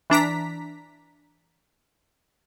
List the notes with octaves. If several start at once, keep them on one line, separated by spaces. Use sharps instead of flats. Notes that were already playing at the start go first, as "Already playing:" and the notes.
E3 D4 A#5 B6